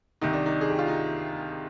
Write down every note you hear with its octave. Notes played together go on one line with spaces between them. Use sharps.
C2 C3 D#3 D#4
D4
D#4
G#4
G4
F4
D#4